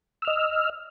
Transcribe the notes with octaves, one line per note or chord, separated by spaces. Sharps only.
D#5 E6 F6